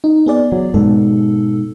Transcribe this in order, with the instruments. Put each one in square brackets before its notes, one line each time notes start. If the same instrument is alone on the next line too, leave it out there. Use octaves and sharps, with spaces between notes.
[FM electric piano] D#4
B3 G#4 D5
[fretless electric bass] F#3
[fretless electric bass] G#2 B2 [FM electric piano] A4